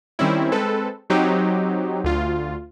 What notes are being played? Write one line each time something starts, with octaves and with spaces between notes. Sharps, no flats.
D#3 G3 C4 C#4 E4
G#3 C4 A4 B4
F#3 C4 D#4 G4
D2 F4